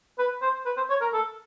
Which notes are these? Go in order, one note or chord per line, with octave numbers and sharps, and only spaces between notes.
B4
C5
B4
C5
C#5
A#4
A4